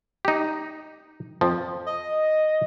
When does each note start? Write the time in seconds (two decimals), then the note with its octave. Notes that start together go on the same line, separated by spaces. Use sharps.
0.25 D#4 G4
1.41 F2 F3
1.86 D#5